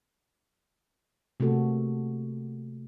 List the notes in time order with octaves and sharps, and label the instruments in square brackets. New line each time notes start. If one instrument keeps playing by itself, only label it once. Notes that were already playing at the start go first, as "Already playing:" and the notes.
[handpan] C3 A3 A#3 F#4 A4